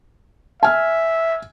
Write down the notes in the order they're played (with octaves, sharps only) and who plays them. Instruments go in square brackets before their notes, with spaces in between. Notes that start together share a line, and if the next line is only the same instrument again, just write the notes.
[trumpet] E5 [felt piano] G#5 F6